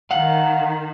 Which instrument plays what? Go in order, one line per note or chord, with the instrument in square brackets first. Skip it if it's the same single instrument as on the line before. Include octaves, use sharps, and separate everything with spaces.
[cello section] D#3 [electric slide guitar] F5 F#5